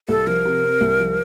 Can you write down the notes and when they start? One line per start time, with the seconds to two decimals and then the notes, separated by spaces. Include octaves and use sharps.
0.09 C2 A4
0.27 F3 A#4
0.45 C3
0.64 C4
0.81 C2
0.99 F3